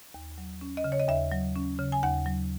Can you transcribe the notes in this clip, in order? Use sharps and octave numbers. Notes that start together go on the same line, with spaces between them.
D#2
F#3
C#4
D#5
C#3
C#5
D#5
D#2 E5
F#3
C#4
C#3
G#5
D#2 F#5
F#3